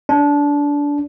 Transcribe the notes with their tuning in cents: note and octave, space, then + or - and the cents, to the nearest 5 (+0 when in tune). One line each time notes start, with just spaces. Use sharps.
D4 -20